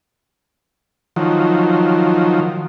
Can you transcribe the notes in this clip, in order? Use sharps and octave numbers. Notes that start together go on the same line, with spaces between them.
D#3 F3 F#3